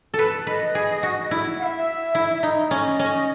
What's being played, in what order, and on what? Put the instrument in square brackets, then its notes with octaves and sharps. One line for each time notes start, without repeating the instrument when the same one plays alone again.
[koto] A4
B4
[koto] B4 [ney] D#5
[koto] G#4
F#4
E4
[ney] F#5
E5
[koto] E4
D#4
[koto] C#4 [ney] D#5
[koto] C#4